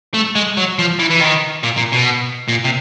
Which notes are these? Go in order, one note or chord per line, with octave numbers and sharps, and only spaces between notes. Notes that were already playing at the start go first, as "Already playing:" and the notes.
A3
G#3
F#3
F3
E3
E3
D#3
A#2
A#2
B2
A#2
C3